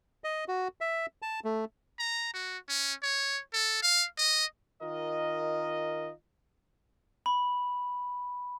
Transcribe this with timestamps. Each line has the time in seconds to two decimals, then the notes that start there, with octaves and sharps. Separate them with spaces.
0.24 D#5
0.48 F#4
0.81 E5
1.22 A5
1.44 A3
1.99 A#5
2.34 F#4
2.69 C#4
3.02 C#5
3.53 A4
3.83 F5
4.18 D#5
4.82 D#3 F4 A#4 D#5
7.26 B5